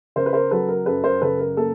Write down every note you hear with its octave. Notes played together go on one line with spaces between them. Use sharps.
C#3 A#4 C5
B4
A#4 C5
F#3 A4 B4
A#4
F#2 A4 B4
A#4 C5
C#3 A4 B4
A#4
A#3 A4